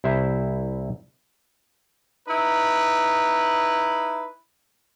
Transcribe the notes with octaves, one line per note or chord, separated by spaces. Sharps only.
C2 E4 C5 E5
D#4 E4 B4